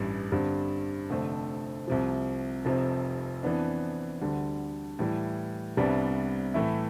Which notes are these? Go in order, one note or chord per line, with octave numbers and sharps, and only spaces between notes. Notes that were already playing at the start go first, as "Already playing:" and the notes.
Already playing: A1 G2 E3 G3
G2 D3 G3 C4
F1 F2 D3 A3 C4
C2 C3 F3
F1 F2 C3 F3 C4
F2 E3 B3 D4
D2 D3 G3
A2 E3 G3
C2 C3 G3 B3 D4
A2 E3 A3 E4